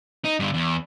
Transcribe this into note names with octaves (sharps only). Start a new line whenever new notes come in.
D#4
G2 D3
E2